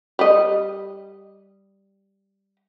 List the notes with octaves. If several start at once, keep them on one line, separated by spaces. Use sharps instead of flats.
G3 D#5